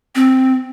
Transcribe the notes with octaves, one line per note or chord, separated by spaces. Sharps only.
C4